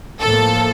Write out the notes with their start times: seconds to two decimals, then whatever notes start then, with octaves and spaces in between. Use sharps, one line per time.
0.21 A2 F3 A#3 A4